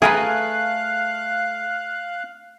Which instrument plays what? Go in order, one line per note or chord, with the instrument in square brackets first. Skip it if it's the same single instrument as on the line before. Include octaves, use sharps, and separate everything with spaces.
[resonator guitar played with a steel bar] A3 [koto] G#4 A#4 B4 [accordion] F5 F#6